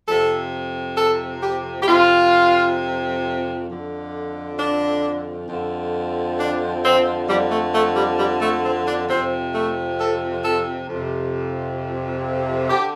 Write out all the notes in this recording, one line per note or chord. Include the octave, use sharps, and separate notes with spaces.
F2 C3 A4
A4
G4
G4
F2 C3 F4
F2 D3
D4
F2 D3
D4
C4
F2 D3 G3
A3
A3
G3
G3
A3
C4
D4
F2 C3 C4
A3
A4
A4
F2 C3
D3 G4